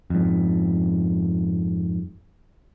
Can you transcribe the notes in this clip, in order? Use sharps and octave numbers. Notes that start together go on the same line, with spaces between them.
F2 G#2